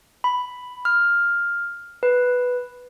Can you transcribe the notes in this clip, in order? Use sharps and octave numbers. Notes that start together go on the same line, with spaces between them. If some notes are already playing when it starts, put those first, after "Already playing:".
B5
F6
B4